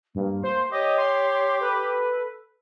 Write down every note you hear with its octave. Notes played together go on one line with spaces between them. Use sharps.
G2 A#3
C5 C6
G4 C#5 D#5
C6
A4 B4